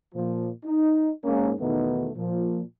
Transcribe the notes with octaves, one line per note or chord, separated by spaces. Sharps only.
A#2 F3
D#4
G#2 A#3 C#4
E2 B2 D#3 A3 B3 D#4
A#2 F3